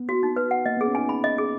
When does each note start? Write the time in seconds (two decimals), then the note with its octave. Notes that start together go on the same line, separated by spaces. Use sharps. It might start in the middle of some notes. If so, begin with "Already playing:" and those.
Already playing: B3
0.09 F#4
0.23 D#4
0.36 B4
0.51 F#5
0.66 A#3 D#5
0.77 B3 G#4
0.87 C#4
0.95 D#4 G#5
1.09 B5
1.24 D#5
1.38 G#4